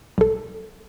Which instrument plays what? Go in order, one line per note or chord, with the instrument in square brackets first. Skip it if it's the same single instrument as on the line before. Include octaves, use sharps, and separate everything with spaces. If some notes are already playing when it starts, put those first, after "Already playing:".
[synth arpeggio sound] B1 A4